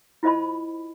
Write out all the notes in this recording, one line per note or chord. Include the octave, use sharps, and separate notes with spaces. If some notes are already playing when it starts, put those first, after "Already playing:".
E4 F4 C5 D#5 A5 B5